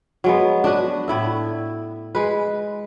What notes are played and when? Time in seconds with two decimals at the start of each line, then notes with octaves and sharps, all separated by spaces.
0.24 F#3 G#3 B3
0.64 D4 F#4 B4
1.08 A2 E4 E5
2.15 G#3 B4